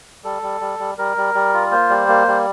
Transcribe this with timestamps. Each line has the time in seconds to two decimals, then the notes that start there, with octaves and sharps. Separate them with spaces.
0.24 G3 A4
0.42 G3
0.61 G3
0.79 G3
0.98 G3 A#4
1.17 G3
1.35 G3
1.54 F4
1.71 A#3 C5
1.90 G3
2.08 A#3
2.27 G3